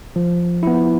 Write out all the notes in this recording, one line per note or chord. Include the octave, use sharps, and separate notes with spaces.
F3
B3 E4